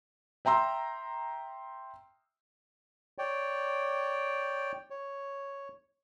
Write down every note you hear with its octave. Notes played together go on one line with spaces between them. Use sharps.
E5 G5 A#5 C6 E6
C#5 D5 G5
C#5